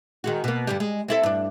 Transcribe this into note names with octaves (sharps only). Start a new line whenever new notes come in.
D#3 G#3 F#4
B2 A#3
G2 D3 G3
G#3
C4 E4 A4
G2 D4